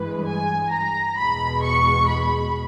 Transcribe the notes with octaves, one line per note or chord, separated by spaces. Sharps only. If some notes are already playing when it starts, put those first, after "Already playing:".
Already playing: G2 E3 G#3 B4
G#5
A#5
E2 B2 G#3 B5
C#6
B5